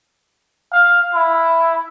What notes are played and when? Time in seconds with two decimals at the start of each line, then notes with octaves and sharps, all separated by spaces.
0.73 F5
1.14 E4